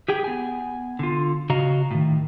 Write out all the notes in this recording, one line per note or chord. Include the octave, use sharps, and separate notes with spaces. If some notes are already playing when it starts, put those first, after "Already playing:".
G4 G#4 G5
B3 G#5
D3 F4
C#3 F#4 D#5 F5 A#5
A2 D#3